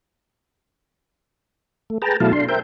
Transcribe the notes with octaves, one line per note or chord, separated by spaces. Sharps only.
A3
G#4 B4 G5 A5 A#5
B2 F#3 A3 E4 F5 A5
D4 C6
A#4 C5 E5 G5 G6